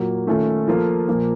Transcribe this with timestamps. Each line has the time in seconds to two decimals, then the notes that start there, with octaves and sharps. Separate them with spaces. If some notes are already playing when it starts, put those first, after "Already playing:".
Already playing: A#2 F#3 A#3
0.27 D#3 A3 C#4 F4 A4
0.68 F3 A#3 F4 A4
1.08 A#2 F3 A#3